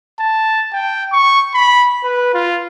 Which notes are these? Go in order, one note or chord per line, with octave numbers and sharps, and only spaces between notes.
A5
G5
C#6
B5
B4
F4